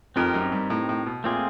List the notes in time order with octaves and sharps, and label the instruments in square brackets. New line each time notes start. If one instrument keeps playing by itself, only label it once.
[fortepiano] F2 [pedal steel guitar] C4 D#4 G4 A#4
[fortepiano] F#2
G2
A2
A2
B2
[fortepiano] A#2 [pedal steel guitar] A3 C4 F4 G#4